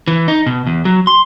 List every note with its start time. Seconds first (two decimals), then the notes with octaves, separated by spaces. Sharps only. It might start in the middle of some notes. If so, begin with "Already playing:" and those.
0.08 E3
0.28 D#4
0.46 B2
0.67 E2
0.85 F#3
1.07 C6